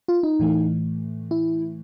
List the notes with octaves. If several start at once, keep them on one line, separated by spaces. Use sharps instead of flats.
F4
D#4
A2 E3 A3
E4